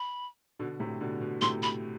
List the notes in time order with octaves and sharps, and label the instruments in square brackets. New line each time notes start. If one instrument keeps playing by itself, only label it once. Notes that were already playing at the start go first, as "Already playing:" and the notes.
Already playing: [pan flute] B5
[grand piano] B2 D3
A2 C3
B2 D3
B2
[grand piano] A2 C3 [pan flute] C6
[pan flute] B5